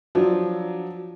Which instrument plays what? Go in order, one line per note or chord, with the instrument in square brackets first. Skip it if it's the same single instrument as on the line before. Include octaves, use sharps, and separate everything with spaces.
[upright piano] F3 F#3 D4